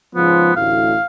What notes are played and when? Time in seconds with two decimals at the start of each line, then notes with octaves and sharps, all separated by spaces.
0.15 G#2 C#3 F3 B3
0.56 A1 D2 A2 F5